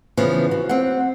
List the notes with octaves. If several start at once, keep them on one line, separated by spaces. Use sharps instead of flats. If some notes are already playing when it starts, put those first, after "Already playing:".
C#3 E3 F3 B3
F#4
C4 F#5